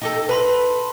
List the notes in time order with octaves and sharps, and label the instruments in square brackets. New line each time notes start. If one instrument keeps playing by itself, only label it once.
[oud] D#4 G4 A4
[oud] B4 [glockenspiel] A5 B5 C6